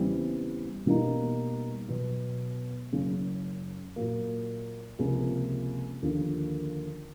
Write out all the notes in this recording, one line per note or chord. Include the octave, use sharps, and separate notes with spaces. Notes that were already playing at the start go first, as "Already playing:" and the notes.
Already playing: E2 C#3 E3 G3 C4
B2 G3 A#3 D#4
B2 F#3 B3
F#1 F#2 C#3
A#2 F#3 A#3
C#2 C3 F3 A#3
D#2 D3 F3 A#3